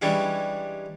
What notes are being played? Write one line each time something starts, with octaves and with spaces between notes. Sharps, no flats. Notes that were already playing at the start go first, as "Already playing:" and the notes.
E3 G3 G#3 C#4 D4 E4